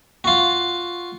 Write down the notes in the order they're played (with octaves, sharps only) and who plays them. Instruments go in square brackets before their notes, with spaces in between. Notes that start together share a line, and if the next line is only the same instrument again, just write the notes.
[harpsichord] F4 F#4